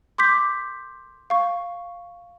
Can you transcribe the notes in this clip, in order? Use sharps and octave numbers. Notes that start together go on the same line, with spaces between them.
C6 D6 G6 B6
F5 C#6